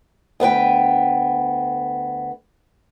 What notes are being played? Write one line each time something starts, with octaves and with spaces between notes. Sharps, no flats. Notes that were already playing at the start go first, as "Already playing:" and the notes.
D2 B3 B4 G5